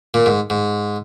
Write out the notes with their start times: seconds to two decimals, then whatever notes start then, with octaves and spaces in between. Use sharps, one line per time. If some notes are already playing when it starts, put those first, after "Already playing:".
0.14 A#2
0.26 G#2
0.50 G#2